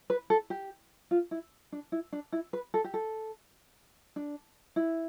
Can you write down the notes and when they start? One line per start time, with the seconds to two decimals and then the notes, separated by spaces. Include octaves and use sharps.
0.10 B4
0.30 A4
0.50 G4
1.11 F4
1.31 E4
1.72 D4
1.92 E4
2.13 D4
2.32 E4
2.53 B4
2.74 A4
2.84 G4
2.94 A4
4.16 D4
4.76 E4